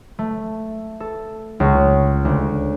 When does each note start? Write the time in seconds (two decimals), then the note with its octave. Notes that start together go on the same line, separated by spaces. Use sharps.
0.19 A3
1.00 A4
1.60 C#2
2.25 D2